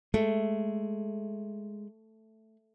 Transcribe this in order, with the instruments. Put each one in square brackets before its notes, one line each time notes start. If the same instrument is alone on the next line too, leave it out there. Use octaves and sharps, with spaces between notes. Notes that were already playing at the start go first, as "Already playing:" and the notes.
[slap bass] G#3 [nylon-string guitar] A3